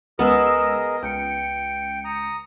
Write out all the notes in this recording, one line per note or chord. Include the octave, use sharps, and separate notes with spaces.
C#2 G#3 B3 G#4 A#4 D#5 E6
C#2 G5 C#7
A#5 D#6